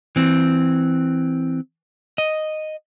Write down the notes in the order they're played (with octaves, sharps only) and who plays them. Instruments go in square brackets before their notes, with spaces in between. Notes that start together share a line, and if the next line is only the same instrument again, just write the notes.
[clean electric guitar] E3 C4
D#5